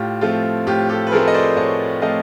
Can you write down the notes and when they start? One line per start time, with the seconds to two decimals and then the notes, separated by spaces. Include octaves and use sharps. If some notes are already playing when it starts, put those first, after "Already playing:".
Already playing: A2 F4 G4
0.21 F3 A3 C4 F4
0.67 A2 F4 G4
0.89 G4 A4
1.07 B4
1.11 F3 A3 C4 G#4 A#4
1.28 D#5
1.34 C5 D5
1.56 A2 C#5 D#5
2.02 F3 A3 C4 D#5 F5